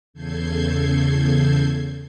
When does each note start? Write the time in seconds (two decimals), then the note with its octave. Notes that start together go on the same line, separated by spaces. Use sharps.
0.13 E2 C#3 A4 G6 G#6 C7